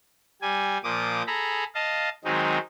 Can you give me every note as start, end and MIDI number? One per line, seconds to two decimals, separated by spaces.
0.41 0.78 55
0.41 0.78 80
0.84 1.23 46
0.84 1.23 53
0.84 1.23 86
0.84 1.23 87
1.27 1.64 68
1.27 1.64 69
1.27 1.64 82
1.27 1.64 83
1.75 2.09 75
1.75 2.09 77
1.75 2.09 81
2.25 2.58 51
2.25 2.58 54
2.25 2.58 56
2.25 2.58 60
2.25 2.58 63